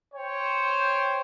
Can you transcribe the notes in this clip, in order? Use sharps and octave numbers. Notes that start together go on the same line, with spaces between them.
C5 C#5 G5